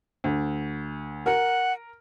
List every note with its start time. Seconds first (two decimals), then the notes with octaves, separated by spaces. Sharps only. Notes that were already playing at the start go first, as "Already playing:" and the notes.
0.24 D2
1.26 A#4 F#5